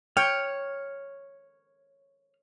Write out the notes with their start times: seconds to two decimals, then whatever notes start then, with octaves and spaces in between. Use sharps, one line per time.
0.17 C#5 G5 F6